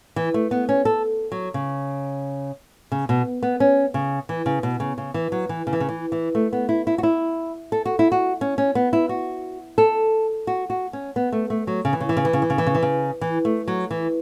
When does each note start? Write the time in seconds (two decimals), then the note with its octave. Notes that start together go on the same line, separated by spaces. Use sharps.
0.16 E3
0.34 A3
0.51 B3
0.69 C#4
0.85 A4
1.32 F#3
1.54 C#3
2.92 C#3
3.09 B2
3.43 B3
3.60 C#4
3.94 C#3
4.29 E3
4.46 C#3
4.63 B2
4.80 C#3
4.98 C#3
5.14 E3
5.32 F#3
5.49 E3
5.67 C#3
5.73 E3
5.80 C#3
5.89 E3
6.12 E3
6.35 A3
6.53 B3
6.69 E4
6.87 E4
6.98 F#4
7.03 E4
7.72 A4
7.85 F#4
7.99 E4
8.12 F#4
8.41 C#4
8.58 C#4
8.75 B3
8.93 E4
9.09 F#4
9.78 A4
10.47 F#4
10.70 F#4
10.93 C#4
11.16 B3
11.32 A3
11.50 A3
11.67 F#3
11.85 C#3
11.93 E3
12.00 C#3
12.09 E3
12.17 C#3
12.25 E3
12.33 C#3
12.42 E3
12.50 C#3
12.58 E3
12.67 C#3
12.75 E3
12.83 C#3
13.21 E3
13.45 A3
13.68 F#3
13.91 E3